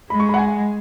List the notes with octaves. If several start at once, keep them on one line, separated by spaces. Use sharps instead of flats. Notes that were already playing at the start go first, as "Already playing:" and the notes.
G#3 B5
C#6
B5
F#5
G#5